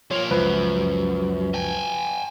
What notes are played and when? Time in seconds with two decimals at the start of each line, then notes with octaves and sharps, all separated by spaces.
0.11 F3 A#3 C#5
0.30 C#2 F#2 F3 B4
1.54 G5 G#5